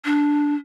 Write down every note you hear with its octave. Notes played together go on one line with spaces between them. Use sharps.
D4